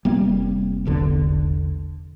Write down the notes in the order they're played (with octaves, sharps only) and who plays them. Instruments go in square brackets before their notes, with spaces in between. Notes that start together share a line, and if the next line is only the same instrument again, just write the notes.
[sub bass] F1 [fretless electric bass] G3 A#3 C4
[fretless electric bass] A#1 E2 D3